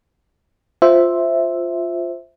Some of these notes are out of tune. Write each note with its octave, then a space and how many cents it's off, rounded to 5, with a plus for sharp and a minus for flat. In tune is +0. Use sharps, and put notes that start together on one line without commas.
F4 +5 C5 +0 E5 +0